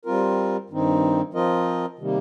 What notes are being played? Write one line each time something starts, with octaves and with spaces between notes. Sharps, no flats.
G3 C4 F4 A#4
G2 D#3 C4 D#4
F3 C4 F4 A#4 D#5
C3 D#3 G3 A#3